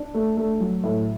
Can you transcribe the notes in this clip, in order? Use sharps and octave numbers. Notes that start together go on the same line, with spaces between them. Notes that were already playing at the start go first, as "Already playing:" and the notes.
Already playing: D4
A3
A3
F#3
A2